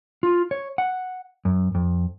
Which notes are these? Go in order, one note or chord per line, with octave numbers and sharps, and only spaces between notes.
F4
C#5
F#5
F#2
F2